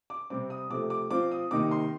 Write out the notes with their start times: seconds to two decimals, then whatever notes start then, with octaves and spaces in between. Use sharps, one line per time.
0.10 D6
0.30 C3 G3 C4 D6
0.50 D#6
0.70 C3 F3 A3 D6
0.90 D6
1.11 F3 C4 F4 D6
1.32 D#6
1.51 C3 D#3 A#3 D#4 D6
1.71 C6